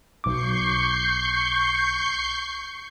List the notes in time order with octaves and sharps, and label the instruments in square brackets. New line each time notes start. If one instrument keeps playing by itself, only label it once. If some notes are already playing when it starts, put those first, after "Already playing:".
[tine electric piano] B1 D6 [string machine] C#6 G6 C7